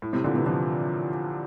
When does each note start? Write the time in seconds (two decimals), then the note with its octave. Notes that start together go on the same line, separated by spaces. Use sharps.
0.02 A2
0.13 A2 C3
0.24 A#2 D3
0.35 C3 E3
0.46 D3 F3